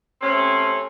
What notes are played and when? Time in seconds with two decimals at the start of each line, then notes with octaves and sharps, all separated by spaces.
0.21 C3 A3 C4 C#4